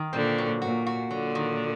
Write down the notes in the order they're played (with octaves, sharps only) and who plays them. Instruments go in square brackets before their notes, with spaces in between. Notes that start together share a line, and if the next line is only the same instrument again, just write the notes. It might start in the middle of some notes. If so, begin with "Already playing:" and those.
Already playing: [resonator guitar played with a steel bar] D#3
[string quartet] A#2 D3 [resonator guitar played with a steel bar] C4
[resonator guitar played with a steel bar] F#3
[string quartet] A#2 [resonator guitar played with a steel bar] F#4
[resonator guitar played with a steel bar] F#4
[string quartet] A#2 D3 [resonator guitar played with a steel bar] F#3
[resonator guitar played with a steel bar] D#3